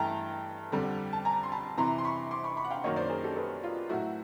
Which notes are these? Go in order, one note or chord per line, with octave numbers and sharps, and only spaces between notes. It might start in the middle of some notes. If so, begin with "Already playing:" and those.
Already playing: G2 E3 A3 G5 A5 A#5
F2 D3 G3
A5
G#5 A#5
C6
A5 B5
F2 C3 E3 A#5 C6
C6
B5 C#6
C6 D6
B5 C#6
B5 C#6
F#5
F5 G5
F#2 D#3 F#3 A#3 C#5 D#5
C5 D5
G#4 A#4
G4 A4
A4 B4
F4
A2 F#3 A3 E4 F#4